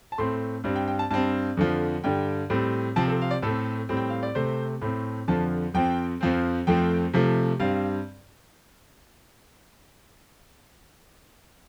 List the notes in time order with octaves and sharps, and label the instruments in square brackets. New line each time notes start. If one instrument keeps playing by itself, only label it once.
[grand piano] A5
A2 A3 C4 C6
G2 G3 C4
G5
G5
A5
G2 G3 C4 A5
F2 D3 F3
G2 D3 G3 G5
A2 G3 C4
C3 F3 C4 A5
A4
F5
D5
A2 A3 C4 A4
A2 G3 C4
G5
F5
D5
C3 A3 C4 C5
A2 A3 C4
F2 D3 F3 A5
F2 F3 C4 G5
F2 F3 C4
F2 F3 A3 C4 G5
C3 F3 A3
G2 G3 C4 F5